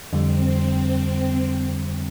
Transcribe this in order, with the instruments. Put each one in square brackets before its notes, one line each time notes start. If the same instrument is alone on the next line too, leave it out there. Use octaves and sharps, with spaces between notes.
[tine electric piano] F2 D3 G3 [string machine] C4